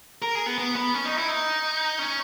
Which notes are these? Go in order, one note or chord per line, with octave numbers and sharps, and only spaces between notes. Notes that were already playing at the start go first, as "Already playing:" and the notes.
A#4
G#4
B3
B3
B3
C#4
D#4
E4
D#4
C#4